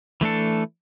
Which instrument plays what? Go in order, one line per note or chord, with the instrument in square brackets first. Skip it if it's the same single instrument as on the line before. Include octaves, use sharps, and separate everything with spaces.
[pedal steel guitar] E3 A3 D4 A4